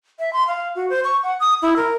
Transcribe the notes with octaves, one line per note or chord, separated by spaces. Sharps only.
E5
C6
F5
F#4
C5
C#6
F#5
D#6
E4
A#4